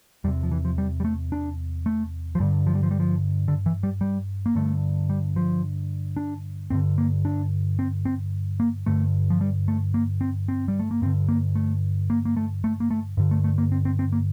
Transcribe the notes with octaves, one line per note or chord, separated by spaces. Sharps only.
E2 C3 G3
F3
E3
F3
G3
G3
A3
D4
A3
F3
G2 D3 G3
F3
G3
F3
G3
F3
D3
E3
G3
G3
A#3
G2 D3 A3
G3
F3
D4
G2 D3 C4
A#3
D4
C4
C4
A#3
G2 D3 A3
F3
G3
A3
A#3
C4
C4
G3
A3
A#3
G2 D3 C4
A#3
A3
A#3
A#3
A3
A3
A#3
A3
G2 D3
A3
A3
A#3
C4
C4
C4
A#3